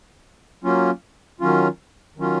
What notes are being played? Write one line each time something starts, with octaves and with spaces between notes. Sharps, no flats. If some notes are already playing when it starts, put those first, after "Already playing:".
F#3 A#3 C#4 F4
D#3 F#3 C#4 F4
D#3 F#3 C#4 F4